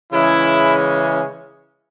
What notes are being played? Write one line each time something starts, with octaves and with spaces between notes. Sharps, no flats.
C#3 E3 G#3 C#4 E4